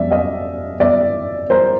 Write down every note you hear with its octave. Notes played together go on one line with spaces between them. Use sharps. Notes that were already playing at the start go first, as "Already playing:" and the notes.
Already playing: F1 F#3 D5 E5
D#5 F5
D5 E5
A#4 C5